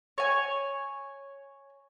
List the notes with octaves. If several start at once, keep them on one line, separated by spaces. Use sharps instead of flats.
C#5 G#5